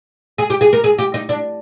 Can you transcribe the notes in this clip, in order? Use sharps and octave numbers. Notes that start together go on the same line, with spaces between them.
G#4
G4
G#4
A#4
G#4
G4
D#4
D4